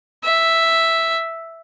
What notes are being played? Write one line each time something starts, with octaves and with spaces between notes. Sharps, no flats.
E5